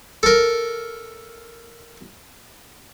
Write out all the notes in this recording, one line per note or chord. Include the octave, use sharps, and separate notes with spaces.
A4 A#4